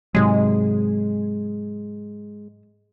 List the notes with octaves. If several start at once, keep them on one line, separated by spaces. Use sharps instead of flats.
G#2 C3 F#3 G#3